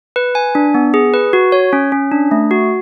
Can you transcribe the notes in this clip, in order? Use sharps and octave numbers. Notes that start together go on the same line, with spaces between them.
B4
G#5
D4
B3
G#4
B4
F#4
C#5
C#4
C#4
D4
A3
F#4